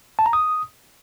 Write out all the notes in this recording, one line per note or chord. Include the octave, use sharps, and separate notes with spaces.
A5
A#5
D#6